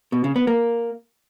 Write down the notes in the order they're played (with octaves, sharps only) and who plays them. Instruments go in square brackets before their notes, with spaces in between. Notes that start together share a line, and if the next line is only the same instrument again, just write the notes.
[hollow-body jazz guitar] B2
C#3
B3
A#3